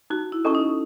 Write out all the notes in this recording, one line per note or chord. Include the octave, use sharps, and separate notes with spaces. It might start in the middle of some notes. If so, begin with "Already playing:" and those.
D#4 F#4
E4
C#4 A4 D#5 A5 C#6
D#4